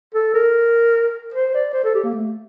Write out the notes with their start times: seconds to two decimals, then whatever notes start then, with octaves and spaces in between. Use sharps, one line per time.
0.14 A4
0.34 A#4
1.34 C5
1.54 D5
1.73 C5
1.84 A4
1.94 G4
2.03 A#3
2.13 A3